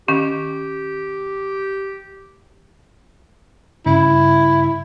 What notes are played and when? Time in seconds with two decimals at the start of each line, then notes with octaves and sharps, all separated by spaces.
0.08 D#3 C#4 G4
3.86 G2 C#3 E4